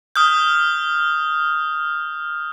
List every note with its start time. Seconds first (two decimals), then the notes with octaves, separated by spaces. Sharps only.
0.16 D#6 F6 G6